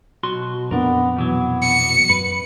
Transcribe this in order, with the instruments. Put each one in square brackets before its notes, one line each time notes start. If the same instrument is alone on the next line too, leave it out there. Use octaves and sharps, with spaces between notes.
[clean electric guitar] B1 F#4 C6 [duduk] B2
[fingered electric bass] F2 A#2 [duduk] B3 [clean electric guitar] D4 A#4
[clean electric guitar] B2 E3 F#3 [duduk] B3
[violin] C#7
[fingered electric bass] F#2 [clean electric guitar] B4